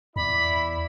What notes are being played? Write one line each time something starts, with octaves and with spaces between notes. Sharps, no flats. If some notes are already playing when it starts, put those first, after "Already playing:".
E2 E4 D5 B5